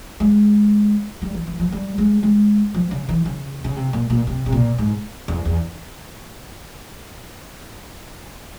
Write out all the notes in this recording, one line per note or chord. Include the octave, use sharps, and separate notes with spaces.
G#3
G3
E3
E3
F3
G3
G#3
G#3
F3
C#3
E3
C#3
C#3
C3
A#2
A#2
C3
C3
A#2
G#2
E2
E2